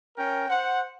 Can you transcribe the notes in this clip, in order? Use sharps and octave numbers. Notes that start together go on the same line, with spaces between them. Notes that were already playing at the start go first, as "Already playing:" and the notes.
C#4 A#4 G5
C5 F#5